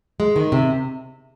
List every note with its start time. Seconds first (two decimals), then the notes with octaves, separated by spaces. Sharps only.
0.20 G#3
0.36 D#3
0.52 C3